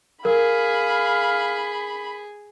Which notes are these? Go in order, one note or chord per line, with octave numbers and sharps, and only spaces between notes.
G#4 A#4 F5 B5